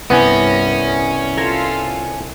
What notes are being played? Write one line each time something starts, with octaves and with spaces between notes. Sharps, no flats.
C2 G2 B3 C#4 G#5 A#6
F4 A4 A#4 G#6